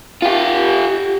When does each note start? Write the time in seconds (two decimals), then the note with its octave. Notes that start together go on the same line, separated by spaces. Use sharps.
0.22 F4 G4